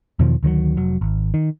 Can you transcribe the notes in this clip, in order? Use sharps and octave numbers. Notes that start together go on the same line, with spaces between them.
E2 B2 D#3 F3
D2 D#3 F3 F#3
F1 F#3
G#1
D#3